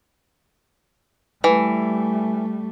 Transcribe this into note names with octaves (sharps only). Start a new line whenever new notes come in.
E3 G3 A3